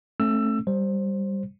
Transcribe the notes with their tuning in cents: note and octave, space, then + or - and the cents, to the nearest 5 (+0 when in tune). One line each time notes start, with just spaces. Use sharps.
A3 +0 C#4 -35 E6 +20
G3 +0 C5 +15